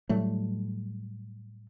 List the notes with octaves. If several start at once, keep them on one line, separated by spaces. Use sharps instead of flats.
A2 F#3 G3 A3